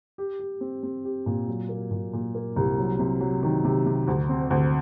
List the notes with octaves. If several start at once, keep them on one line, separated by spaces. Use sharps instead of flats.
G4
G4
C4
C4
G4
A#2
F#3
A#3
A#2
A#2
A#3
C2
F#3
C3
F#3
D#3
C3
C3
D2
C4
D2